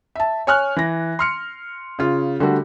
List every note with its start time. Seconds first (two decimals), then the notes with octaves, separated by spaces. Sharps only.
0.16 E5 A5
0.47 C#5 G#5 F6 F#6
0.76 E3 A#6
1.19 C6 F6 C#7
1.99 C#3 F4
2.40 D3 G3 A3 F#4